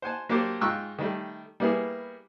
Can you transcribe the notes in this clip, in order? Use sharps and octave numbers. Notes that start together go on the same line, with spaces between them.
C5 F#5 G#5 A5
F#3 A#3 D4 G4 C5 D5
G#2 F4 G5 C#6 E6 F#6
D#3 G3 A3
G3 A#3 B3 E4 G#4